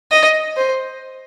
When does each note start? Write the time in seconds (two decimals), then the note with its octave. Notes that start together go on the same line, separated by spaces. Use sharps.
0.11 D#5
0.57 C5